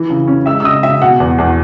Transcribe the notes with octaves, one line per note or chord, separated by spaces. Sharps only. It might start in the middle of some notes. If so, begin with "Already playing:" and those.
Already playing: E3
C#3
C#4
G#3 E5 E6
E6
C#3 D#5 D#6
C#3 E5
B2 F#5
E2
E2